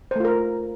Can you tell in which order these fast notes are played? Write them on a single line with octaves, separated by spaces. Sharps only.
C5 A3 F4 A#4